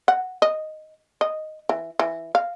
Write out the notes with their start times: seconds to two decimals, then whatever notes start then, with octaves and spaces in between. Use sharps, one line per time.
0.08 F#5
0.42 D#5
1.21 D#5
1.69 E3
1.99 E3
2.35 F5